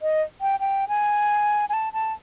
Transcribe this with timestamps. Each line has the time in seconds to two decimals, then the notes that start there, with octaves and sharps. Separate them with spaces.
0.02 D#5
0.41 G5
0.60 G5
0.88 G#5
1.69 G#5
1.73 A5
1.93 A5